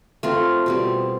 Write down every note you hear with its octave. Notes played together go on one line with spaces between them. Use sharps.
A3 C4 F4 A#4
B2 G3 C4